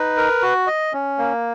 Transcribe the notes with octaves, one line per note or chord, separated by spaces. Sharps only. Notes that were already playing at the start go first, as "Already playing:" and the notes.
Already playing: D#4 B4
A#4
F#4
D#5
C#4
A#3